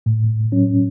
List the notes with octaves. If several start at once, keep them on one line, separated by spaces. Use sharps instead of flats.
A2
F#3 C#4